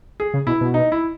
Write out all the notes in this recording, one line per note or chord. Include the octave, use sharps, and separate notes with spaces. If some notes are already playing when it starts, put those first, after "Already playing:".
G#4
C#3
B2 E4
B2
D#4
E4